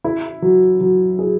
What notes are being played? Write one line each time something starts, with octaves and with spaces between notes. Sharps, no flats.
E4
F#3
F#3
G#4